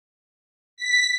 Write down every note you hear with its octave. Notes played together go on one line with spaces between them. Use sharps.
B6